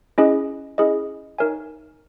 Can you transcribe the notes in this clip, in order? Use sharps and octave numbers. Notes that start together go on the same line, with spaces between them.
C#4 E4 G#4 D#5
C#4 E4 G#4 D#5
D#4 A#4 C#5 E5 G#5